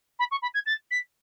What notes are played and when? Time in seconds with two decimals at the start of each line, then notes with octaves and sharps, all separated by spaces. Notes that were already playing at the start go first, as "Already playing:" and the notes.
0.19 B5
0.31 C#6
0.42 B5
0.54 G#6
0.66 A6
0.91 B6